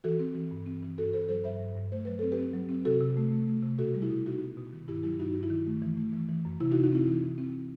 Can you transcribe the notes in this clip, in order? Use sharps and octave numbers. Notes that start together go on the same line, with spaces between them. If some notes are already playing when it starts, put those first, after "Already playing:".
E3 F#4 A4
C4
E3
G2
C4
E3
G2 F#4 A4
G2 A4 C5
F#3 A4 C5
G2 C5 E5
G2
G2
A3 C5
F#3 B4
C4 A4
G4 B4
C4
F#3
C4
C3 F#4 A4
C3
A3
A3
A3
C3
B2 F#4 A4
G3
E4 G4
B2
B2 D#4 F#4
B3
B2
D#3
G2 E4 G4
F#3 E4 G4
G2 D#4 F#4
G2 F#4
E4
D#3
A3
E3
A3
E3
E3
F#2
C3 E4
D#4 F#4
C3
D#4 F#4
C4 E4
E3 D#4
E3
C4